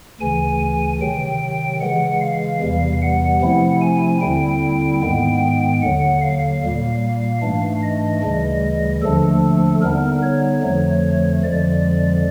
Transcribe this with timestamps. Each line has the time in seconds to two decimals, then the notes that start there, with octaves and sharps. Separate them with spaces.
0.20 D2 C#3 E3 G#5
1.01 C3 D#3 F#3 G5
1.80 C#3 E3 G#3 F#5
2.21 F5
2.61 E2 C3 E3 G3
3.02 F#5
3.41 C3 F3 A3 C4 E4
3.81 G#5
4.21 D#2 D3 G3 C4 E4 G5
5.01 G#2 D#3 G#3 B3 G5
5.82 D#2 D3 F#3 F#5
6.22 F5
6.62 A#2 G3 A#3
7.42 G#2 E3 A3 D4
7.83 D#5
8.22 D2 C#3 E3 G3
9.03 D#2 D3 F3 A3 D4 A4
9.82 D3 G3 B3 D#4 A#4
10.23 C#5
10.63 F2 D3 F3 A3
11.43 F2 D3 F3 G#3 D5